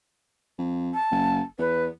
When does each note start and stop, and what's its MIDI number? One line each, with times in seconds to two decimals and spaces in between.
0.59 0.93 41
0.94 1.39 81
1.12 1.41 30
1.59 1.89 40
1.59 1.84 71